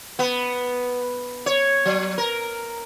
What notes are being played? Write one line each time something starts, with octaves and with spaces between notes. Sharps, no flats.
B3
C#5
F#3
A#4